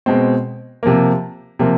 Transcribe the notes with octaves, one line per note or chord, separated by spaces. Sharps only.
B2 G#3 C4
C3 F3 A#3
C3 F3 A#3